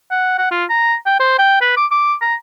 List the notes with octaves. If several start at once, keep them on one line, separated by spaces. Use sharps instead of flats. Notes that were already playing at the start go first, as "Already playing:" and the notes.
F#5
F#5
F4
A#5
G5
C5
G5
B4
D6
D6
A#5